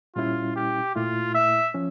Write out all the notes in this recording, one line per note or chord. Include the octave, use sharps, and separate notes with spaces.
A#2 G3 C#4 E4 F4
G4
A#2 A3 E4 F4
E5
F3 C#4